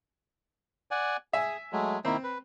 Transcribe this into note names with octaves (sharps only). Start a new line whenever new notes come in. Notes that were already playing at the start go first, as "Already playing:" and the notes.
D5 F#5 G#5
G#4 E5 G#5
F#3 G#3 A3
D#3 A#3 C4 E4
B4